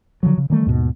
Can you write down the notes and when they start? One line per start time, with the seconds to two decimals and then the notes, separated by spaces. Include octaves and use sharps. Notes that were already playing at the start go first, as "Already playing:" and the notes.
0.23 D3 F3 F#3
0.37 C#3
0.50 D#3 E3 G3 A3
0.66 D#2 G#2 B2